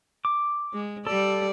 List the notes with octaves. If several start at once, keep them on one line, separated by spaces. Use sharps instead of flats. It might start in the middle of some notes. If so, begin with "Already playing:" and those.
D6
G#3
G3 A4 D5